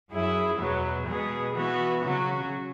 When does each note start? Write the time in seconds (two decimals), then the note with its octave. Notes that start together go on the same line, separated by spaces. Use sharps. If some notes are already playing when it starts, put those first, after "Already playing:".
0.10 F#2 F#3 E4 G#4
0.59 E2 B2 F#3 B3
1.06 B2 G#3 B3 G#4
1.55 E3 B3 F#4
2.03 C#3 F#3 C#4 F#4